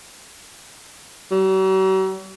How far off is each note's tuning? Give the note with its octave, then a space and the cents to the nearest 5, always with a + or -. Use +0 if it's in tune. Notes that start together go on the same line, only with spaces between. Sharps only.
F#3 +45